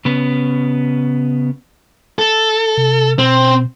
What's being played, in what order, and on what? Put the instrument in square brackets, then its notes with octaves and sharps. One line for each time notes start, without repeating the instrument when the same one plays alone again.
[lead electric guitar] C#3 B3
A4
[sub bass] C3
[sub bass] B2 [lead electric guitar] C4